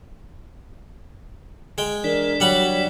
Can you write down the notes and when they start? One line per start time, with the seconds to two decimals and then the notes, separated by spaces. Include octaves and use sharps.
1.78 G#3 G5
2.04 E3 D4 A#4 D5
2.40 F#3 G3 F#5 B5